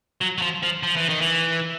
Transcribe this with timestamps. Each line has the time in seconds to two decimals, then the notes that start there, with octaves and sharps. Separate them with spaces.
0.21 F#3
0.38 F#3
0.42 F3
0.63 F3
0.83 F3
0.96 E3
1.09 D#3
1.21 E3